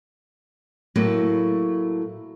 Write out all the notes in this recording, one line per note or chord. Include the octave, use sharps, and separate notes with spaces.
A2 F#3 A3 A#3